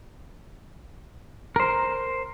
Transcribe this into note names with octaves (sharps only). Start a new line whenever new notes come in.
A#4 C5